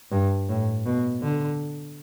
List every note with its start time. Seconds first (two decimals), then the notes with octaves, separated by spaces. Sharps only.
0.11 G2
0.49 A2
0.86 B2
1.22 D3